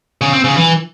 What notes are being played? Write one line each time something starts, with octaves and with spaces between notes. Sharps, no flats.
C#3
C4
C#3
E3